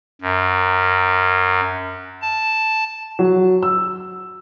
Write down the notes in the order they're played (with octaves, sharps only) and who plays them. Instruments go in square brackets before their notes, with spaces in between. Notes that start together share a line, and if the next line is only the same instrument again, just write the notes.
[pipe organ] F#2
A5
[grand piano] F#3
E6